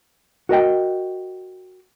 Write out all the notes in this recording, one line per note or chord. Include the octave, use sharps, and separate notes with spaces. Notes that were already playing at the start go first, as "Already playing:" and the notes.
F#4 A#4 D#5 G5